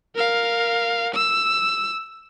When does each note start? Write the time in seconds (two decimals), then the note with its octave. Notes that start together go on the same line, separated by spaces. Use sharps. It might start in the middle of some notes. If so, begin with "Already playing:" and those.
0.16 A#4 F5
1.14 E6